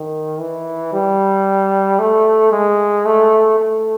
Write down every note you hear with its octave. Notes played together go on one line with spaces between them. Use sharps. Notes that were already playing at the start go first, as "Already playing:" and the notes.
Already playing: D#3
E3
G3
A3
G#3
A3
A3